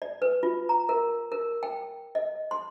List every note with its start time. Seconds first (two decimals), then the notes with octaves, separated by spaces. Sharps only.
0.02 D5
0.22 B4
0.43 F4
0.69 A#5
0.89 A#4
1.32 A#4
1.63 G5
2.15 D#5
2.51 C6